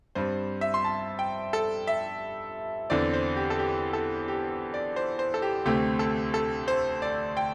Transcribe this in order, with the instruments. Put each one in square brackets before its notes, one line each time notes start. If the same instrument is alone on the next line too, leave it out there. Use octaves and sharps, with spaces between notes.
[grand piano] G2 G3 C4 C5
E5
C6
A5
G5
A4
E5
E2 D3 C4 D5
C5
G4
A4
G4
A4
G4
D5
C5
C5
A4
G4
D2 C3 A3 C4 G4
A4
A4
C5
D5
G5